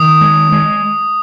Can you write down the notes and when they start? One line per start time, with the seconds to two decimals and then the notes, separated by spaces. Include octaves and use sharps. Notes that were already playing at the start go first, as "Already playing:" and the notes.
Already playing: D#3 D#6
0.21 G#3
0.52 G#3